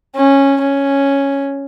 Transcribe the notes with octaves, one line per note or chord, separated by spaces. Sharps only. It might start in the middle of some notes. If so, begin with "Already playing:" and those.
C#4
C#4